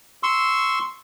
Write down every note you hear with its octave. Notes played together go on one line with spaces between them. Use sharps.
C6 C#6 E6